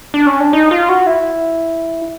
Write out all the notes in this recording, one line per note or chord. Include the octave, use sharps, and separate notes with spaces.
D4
C#4
D4
D#4
F4
F#4
E4